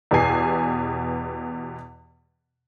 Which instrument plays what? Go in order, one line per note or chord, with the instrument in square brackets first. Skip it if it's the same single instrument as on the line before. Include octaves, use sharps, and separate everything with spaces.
[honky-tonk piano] E2 B2 B3 G4 G#5 C7